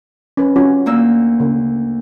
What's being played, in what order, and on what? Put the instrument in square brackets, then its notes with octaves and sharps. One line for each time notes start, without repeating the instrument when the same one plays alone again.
[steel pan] C#4 B4
C#4 F4 F#4
[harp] D2 A#3 E6
[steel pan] C#3